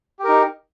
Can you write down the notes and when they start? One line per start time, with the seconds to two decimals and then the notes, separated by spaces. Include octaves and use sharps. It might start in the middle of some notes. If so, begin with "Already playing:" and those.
0.20 G4
0.24 A#4
0.29 D#4